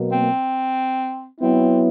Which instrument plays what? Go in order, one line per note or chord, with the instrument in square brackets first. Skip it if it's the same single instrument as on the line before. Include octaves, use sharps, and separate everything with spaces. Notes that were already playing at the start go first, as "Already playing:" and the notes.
Already playing: [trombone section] B2 F#3 A#3
[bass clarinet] C4
[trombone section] F#3 B3 E4 [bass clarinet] C4